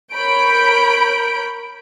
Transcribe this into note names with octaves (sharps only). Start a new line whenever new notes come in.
A#4 C#5 B5 G6 D7